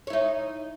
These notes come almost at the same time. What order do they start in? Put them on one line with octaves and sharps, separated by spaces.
C#5 E4 D#4